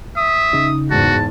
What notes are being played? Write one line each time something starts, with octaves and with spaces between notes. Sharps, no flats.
E5 D#6
C#3 D#4
E2 G#2 F#4 A5